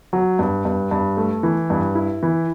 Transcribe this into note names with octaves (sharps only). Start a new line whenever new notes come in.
F#3
G2
G2
G2
A3
E3
G2
E4
E3